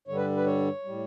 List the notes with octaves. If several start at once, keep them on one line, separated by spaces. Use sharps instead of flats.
G2 D3 G3 C#5
B4
B4
C#5
A2 G3